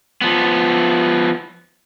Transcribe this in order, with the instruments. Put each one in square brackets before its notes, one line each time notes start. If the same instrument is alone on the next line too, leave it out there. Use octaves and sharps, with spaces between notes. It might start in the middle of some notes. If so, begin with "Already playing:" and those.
[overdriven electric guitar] F3 B3